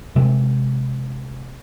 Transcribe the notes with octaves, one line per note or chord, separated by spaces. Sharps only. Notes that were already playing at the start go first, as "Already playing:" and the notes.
C3 G#3